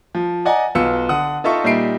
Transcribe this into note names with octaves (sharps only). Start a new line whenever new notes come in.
F3
D5 D#5 F#5 G#5 A#5
B1 B3 F4 E6 C#7
D3 F#5 D#6
D#4 F4 A4 E5 C#6
A#2 G3 D#4 E5 C7 D7